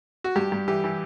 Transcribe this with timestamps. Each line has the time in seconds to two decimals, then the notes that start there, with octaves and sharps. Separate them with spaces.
0.24 F#4
0.36 G2 G4
0.52 G2
0.68 E3 G4
0.84 E3